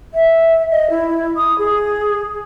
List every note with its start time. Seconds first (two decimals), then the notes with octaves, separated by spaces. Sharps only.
0.14 E5
0.71 D#5
0.90 E4
1.36 D#6
1.58 G#4